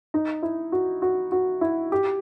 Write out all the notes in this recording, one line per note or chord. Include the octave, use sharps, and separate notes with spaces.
D#4
E4
F#4
F#4
F#4
E4
G4